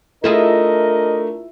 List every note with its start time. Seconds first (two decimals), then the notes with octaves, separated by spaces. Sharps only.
0.24 A3 D4 E4 F4 G#4 A#4 D#5